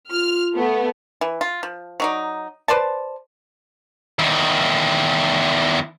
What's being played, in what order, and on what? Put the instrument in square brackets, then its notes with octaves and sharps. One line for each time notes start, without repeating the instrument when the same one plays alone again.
[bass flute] F4 [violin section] F6
[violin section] A3 B3
[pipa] E3
F4
F3
F#3 D#4 D5
B4 C5 D5 A5
[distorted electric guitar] E2 D#3